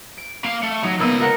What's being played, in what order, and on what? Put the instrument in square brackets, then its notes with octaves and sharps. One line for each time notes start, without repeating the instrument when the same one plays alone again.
[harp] D7
[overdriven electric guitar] A#3 F5
A3
[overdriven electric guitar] F#3 [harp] D#4
[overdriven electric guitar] C#2 D#5 [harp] A#3 B3 E6
[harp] A#4 F#5 C#7